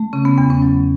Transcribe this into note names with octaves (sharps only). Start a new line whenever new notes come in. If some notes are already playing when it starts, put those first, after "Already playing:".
Already playing: A3
C#3 C#4
B3
E2 B3
C#4
F#3